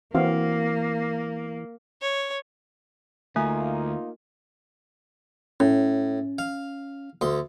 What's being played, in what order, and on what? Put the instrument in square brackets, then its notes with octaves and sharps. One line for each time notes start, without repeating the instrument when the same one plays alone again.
[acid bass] E3 [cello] A#3 [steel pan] C4 F#4 F5
[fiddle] C#5
[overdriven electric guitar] D2 [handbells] A3 [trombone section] A#3 D#4 F4 [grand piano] G#5
[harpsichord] A2 [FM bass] C#4
[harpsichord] F5
D2 C6